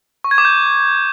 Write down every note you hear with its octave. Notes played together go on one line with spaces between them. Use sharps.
C#6
G#6
D6
G6